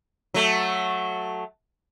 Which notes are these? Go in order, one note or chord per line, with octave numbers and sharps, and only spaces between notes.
F#3 A3